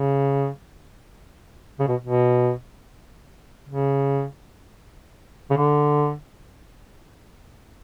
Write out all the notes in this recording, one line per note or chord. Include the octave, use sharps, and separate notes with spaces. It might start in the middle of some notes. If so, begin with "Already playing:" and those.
Already playing: C#3
C#3
B2
B2
C#3
C#3
D3